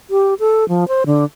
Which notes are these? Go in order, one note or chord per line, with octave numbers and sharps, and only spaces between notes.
G4
A4
F3
C5
D3